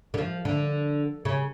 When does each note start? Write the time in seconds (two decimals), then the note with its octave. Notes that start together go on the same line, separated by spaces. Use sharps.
0.14 D3
0.18 F3
0.45 D3
1.25 C#3